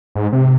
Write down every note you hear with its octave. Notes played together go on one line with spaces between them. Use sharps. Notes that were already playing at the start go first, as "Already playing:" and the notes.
G#2
C3